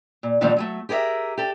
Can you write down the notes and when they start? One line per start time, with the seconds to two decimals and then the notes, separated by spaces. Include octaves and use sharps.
0.23 A#2
0.41 A#2 D3 D#3 F3 G3 A3
0.57 F#3 G#3 A3
0.89 G4 G#4 A#4 D5 E5
1.38 G4 A4